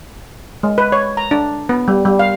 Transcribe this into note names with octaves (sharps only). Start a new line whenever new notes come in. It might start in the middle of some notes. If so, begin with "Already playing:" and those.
G#3
B4
C#5
A#5
D4
B3
G3
G3
F5